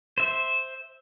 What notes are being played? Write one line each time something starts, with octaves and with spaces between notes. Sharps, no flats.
C5 E5